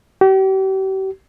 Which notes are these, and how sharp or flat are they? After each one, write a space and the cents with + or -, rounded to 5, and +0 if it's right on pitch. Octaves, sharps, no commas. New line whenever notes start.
G4 -40